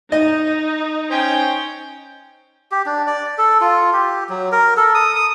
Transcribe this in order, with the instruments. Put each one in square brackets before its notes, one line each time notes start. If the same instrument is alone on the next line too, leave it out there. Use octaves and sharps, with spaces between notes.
[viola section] D#4 [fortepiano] D#5
[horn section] C#4 C5 G5
[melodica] G4
D4
D5
A4
F4
G4
F#3
A#4
A4
D#6
D#6